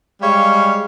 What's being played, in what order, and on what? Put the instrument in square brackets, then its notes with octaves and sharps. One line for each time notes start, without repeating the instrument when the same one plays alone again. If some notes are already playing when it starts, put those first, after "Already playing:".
[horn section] G3 G#3 C#5 F5